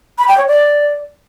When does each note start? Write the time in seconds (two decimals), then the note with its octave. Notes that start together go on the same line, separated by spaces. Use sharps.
0.18 B5
0.28 G5
0.38 C#5
0.47 D5